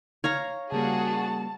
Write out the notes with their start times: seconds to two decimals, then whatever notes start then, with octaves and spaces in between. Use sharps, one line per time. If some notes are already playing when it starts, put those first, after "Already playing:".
0.24 C#5 F5 A#5
0.72 C#3 G3 A#3 F#4 G#4 A5